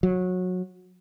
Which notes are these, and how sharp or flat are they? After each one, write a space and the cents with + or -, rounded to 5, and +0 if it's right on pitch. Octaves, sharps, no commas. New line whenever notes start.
F#3 -20